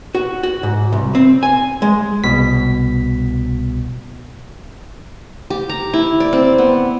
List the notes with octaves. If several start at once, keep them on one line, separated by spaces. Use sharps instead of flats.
F#4
F#4
G#2
C2
C4
G#5
G#3
C2 B2 B6
G4
A#5
E4
D5
C4
B3